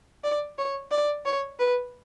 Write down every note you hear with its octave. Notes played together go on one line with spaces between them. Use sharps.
D5
C#5
D5
C#5
B4